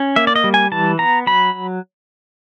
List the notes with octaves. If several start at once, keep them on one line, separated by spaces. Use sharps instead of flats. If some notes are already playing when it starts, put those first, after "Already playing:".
Already playing: C#4
A#3 E5
D5
D#5
G3
G#5
E3 A5
B3 A#5
F#3 B5